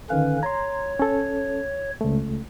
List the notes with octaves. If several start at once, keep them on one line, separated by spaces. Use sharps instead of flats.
D3 D#3 C#4 B4 F5
C#5 A#5 C6
C#4 A4
C#2 A3